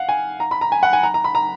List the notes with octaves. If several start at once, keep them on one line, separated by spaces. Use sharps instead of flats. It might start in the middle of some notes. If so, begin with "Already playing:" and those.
Already playing: F5 F#5
G#5
A#5
B5
A#5
G#5
F#5
G#5
A#5
A#5
B5
A#5